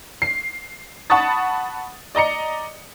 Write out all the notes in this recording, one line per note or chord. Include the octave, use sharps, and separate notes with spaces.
C7
F#5 A5 B5 C#6 D#6 A6
D5 D#5 A#5 C#7